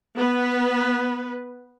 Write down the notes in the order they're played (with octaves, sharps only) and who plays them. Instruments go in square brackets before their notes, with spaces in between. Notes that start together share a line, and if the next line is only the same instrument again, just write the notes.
[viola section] B3 B4